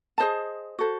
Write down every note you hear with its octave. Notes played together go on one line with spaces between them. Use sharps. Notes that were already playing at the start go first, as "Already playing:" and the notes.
G#4 C5 D#5 A5
F#4 A4 C5